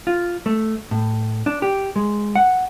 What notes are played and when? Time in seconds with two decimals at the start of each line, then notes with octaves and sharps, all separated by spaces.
0.07 F4
0.46 A3
0.91 A2
1.46 D4
1.62 G4
1.96 G#3
2.35 F#5